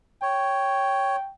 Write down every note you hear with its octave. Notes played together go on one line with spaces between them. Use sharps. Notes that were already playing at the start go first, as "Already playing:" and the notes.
C#5 G5